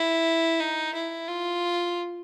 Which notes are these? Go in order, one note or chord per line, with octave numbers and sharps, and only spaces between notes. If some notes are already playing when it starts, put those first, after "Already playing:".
Already playing: E4
D#4
E4
F4